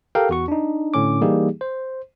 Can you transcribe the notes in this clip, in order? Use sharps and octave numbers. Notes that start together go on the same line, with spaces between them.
G4 A4 A#4 F5 G5
E2 F#4 C#6
D4 D#4
A2 D3 C#4 D6
E3 G3 A#3 D#4 G4 G#4
C5